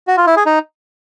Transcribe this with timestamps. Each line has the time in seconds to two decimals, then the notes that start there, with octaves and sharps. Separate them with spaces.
0.08 F#4
0.17 F4
0.27 E4
0.36 G#4
0.46 D#4